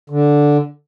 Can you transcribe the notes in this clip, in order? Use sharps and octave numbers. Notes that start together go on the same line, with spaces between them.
D3